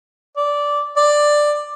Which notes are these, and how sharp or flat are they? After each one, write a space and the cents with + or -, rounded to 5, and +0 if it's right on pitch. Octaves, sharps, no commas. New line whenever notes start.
D5 -10
D5 +10